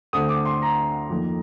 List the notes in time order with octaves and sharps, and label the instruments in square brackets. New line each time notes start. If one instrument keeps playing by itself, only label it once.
[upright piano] D2 D3 A3 C4 D#6
D6
C6
A#5
F2 D#3 A#3